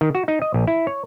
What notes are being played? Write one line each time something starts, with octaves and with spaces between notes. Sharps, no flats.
D#3
F#4
D#4
D#5
A#1
E4
C#5